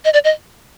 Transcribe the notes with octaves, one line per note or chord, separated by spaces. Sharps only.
D#5
D5
D#5